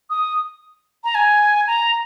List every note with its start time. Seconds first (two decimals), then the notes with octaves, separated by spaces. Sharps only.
0.10 D#6
1.04 A#5
1.15 G#5
1.67 A#5